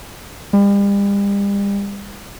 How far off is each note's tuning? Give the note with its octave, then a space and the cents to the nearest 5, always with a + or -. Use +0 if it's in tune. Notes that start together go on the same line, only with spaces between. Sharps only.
G3 +40